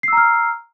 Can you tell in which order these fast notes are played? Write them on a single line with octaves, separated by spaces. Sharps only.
C7 E6 A#5 F6